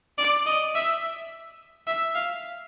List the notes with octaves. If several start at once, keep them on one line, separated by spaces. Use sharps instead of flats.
D5
D#5
E5
E5
F5